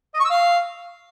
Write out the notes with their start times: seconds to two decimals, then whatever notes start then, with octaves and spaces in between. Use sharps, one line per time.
0.14 D#5
0.19 C#6
0.25 E6
0.30 F5